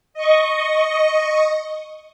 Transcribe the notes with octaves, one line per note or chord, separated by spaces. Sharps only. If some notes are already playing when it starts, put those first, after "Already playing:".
D#5 C#6